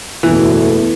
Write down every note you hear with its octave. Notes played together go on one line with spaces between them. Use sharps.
F#1 E2 B2 E3 A3